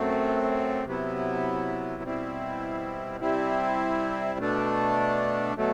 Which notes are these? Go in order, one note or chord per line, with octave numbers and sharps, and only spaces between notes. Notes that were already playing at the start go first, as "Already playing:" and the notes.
Already playing: F#2 F#3 A3 C4
C3 F#3 B3 E4
B2 G3 C4 E4
C3 G3 C4 E4
B2 A3 D4
B2 F#3 A3